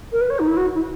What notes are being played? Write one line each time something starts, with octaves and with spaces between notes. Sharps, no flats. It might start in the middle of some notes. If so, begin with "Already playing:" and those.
A#4
B4
C#5
D#4
E4
F#4
E4